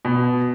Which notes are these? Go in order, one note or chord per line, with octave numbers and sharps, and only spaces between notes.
B2